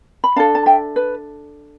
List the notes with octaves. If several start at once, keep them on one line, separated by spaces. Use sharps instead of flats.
B5
D4 A4 F5 A5
A5
E5 G5
B4